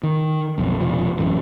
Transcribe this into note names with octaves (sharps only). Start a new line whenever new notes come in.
D#3
B1 F2 B2
F1 B2 F3
A1 F#2 C3 E3